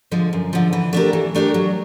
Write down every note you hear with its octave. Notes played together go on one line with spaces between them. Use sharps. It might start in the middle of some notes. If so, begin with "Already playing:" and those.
D3 F3 G#3
F#2
D3 F3 G#3
E3
A3 D4 G4 A#4
E3
A3 D4 G4 A#4
F#3